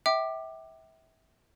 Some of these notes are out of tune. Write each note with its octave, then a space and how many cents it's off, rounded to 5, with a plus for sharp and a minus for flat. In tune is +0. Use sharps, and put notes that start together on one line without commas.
E5 -25 G5 -25 D6 +20